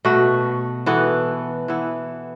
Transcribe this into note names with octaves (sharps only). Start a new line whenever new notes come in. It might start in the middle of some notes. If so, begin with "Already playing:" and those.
B2 A3 F#4
E3 B3 F#4 A4
E3 B3 E4